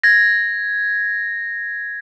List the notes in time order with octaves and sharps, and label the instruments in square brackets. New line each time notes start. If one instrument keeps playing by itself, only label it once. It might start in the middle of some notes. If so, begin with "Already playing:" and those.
[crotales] G#6 A#6